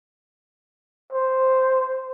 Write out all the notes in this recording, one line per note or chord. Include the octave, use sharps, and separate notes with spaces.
C5